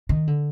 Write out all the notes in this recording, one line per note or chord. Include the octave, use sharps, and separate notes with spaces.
D#3
D3